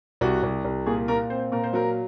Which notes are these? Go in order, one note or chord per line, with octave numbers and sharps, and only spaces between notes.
C2 F#4
C2
C2
A#2 G#4
A#2 A#4
C4 C5
A#2 A#4
C5
F#3 A#4